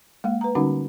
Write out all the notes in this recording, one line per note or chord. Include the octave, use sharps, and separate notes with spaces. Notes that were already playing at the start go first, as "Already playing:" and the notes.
G#3 A#3 F5
B4 A#5
D3 G3 C#4 D#4 F#4 F#5